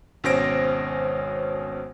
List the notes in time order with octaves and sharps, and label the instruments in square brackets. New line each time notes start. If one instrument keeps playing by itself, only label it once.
[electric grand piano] G#1 B2 C#4 C5 A#6 D7